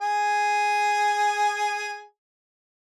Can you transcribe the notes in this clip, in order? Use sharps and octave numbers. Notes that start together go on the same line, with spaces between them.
G#4 G#5